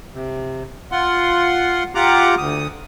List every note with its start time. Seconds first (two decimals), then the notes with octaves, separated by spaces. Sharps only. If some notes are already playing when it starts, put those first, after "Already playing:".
0.14 C3
0.92 F4 F#5 C6
1.95 F4 G4 F#5 A#5 D6
2.38 D2 D#6